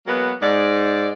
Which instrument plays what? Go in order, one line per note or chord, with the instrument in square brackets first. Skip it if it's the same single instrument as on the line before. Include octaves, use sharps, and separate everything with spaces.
[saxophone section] F#3 G#3 A#3 B3
G#2 D5